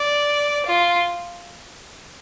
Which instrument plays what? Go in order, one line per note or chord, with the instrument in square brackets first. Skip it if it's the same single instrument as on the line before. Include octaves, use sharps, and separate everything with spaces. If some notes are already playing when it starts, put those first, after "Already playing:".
Already playing: [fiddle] D5
F4